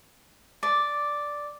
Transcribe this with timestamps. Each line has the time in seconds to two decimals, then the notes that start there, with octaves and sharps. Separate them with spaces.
0.63 D5